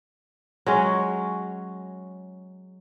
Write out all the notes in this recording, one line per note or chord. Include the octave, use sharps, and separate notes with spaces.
F#3 G#3 C#4